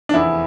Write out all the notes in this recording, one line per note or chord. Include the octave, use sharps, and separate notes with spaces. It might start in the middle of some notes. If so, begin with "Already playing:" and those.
D4
F1 E2 E3 E4